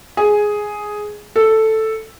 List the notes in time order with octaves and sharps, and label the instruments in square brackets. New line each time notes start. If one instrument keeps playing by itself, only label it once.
[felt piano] G#4
A4